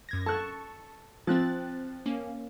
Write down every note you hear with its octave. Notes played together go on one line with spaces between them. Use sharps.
F#2 G#6 A#6
A4 A5 C#6 F#6
F3 C4 F#6 A6
A#3 C#4